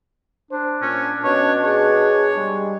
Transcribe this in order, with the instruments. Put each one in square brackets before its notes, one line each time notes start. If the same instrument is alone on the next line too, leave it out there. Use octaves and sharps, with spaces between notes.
[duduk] D4 [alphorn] C5
[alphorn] A#2 [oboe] C#4
[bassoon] B2 [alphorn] C#4 [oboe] C#5
[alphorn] G#4 [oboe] C#5
[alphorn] G3 [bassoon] G#3